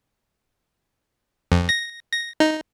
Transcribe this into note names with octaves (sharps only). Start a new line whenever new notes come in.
F2
A#6
A#6
D#4